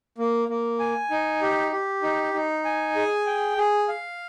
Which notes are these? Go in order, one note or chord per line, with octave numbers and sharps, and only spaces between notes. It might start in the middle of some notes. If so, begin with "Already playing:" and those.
A#3
A#3
G#5
D#4
G4
G4
D#4
D#4
G#5
G#4
G5
G#4
F5